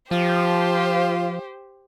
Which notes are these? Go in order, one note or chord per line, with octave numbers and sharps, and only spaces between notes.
F3 F4 G4 C5